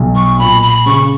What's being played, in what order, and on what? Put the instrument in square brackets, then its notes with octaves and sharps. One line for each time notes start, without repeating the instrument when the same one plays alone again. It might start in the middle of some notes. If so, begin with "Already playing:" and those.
Already playing: [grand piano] B1
[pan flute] C#6
[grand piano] A#2 [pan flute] B5
[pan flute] B5
[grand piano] C#3 [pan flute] C#6